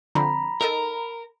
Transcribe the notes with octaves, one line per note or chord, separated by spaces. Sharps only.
D3 F3 C4 A#5 B5
D#4 A4 A#4 D#5